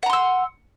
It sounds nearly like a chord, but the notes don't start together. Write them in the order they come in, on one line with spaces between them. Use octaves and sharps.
F#5 A#5 C6 E6